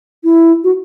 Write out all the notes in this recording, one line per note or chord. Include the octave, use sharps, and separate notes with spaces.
E4
F#4